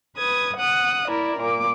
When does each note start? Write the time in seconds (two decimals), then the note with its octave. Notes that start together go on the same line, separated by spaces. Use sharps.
0.18 B4 D#6 G#6
0.58 F#5 D#6 F#6
1.09 E4 A#4 D5
1.40 A#2 D6